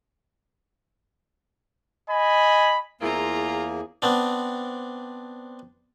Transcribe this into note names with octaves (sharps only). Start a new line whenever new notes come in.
D#5 G#5 B5
E2 A#3 C4 E4 F4 G#4 A#4 A#5
B3 C4 D4